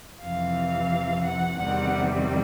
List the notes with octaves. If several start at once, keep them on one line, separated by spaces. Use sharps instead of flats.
F2 C3 E3 F5
F#5
E2 C3 D#3 G3 F#5